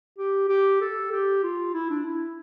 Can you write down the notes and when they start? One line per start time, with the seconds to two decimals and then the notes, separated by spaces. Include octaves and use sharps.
0.18 G4
0.49 G4
0.81 A4
1.11 G4
1.43 F4
1.74 E4
1.90 D4
2.05 E4